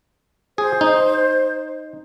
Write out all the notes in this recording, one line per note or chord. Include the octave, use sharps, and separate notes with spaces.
G#4 C5
D#4